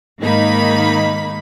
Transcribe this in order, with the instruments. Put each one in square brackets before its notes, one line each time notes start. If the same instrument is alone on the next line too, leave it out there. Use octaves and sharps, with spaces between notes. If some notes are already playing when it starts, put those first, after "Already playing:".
[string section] G#2 D#3 A#3 D#4 B5